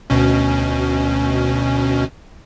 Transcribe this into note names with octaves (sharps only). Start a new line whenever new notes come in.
D2 B2 C#4